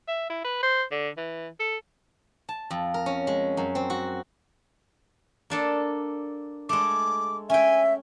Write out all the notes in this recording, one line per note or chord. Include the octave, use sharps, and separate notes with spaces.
E5
E4
B4
C5
D3
E3
A4
A5
F2
A#4
C#4
G#3
F#2
C4
F#4
A#3 D4 A4
G#3 A3 D6
C#4 E5 G5 G#5